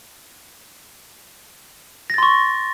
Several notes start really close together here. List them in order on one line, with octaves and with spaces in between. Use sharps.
A#6 A6 C6 C#6